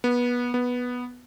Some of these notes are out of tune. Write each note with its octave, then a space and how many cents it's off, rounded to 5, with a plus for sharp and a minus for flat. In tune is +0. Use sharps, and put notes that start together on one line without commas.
B3 -20
B3 -5